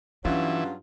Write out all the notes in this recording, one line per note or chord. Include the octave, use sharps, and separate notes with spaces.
G2 E3 F#3 C#4 F4